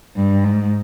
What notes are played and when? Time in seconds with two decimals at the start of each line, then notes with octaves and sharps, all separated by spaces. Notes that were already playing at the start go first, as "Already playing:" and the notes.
0.16 G2
0.44 G#2